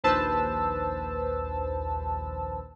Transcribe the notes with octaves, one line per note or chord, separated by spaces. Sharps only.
A#1 D#2 B4 C5 A5 E6